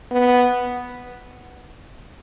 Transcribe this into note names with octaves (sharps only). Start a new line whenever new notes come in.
B3